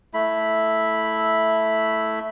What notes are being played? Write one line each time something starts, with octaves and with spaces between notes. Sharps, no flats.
A3 E4 B5